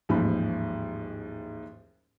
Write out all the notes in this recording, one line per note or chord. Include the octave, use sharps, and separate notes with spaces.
A1 D#2 G#2 F3 B5